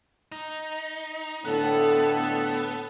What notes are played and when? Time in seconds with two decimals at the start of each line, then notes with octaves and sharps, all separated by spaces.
0.32 D#4
1.45 A2 D3 B3 A4